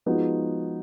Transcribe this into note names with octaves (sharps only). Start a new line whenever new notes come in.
F3 G#3 B3 D#4 F#4